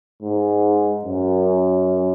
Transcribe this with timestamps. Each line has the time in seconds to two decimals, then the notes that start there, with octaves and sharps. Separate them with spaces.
0.22 G#2
1.04 F#2